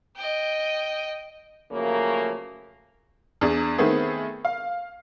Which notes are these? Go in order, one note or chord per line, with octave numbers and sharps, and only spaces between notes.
D#5 G5
C#3 F3 F#3 A3 A#3
E2 D4 G#4
D#3 A3 B3 C4 G#4
F5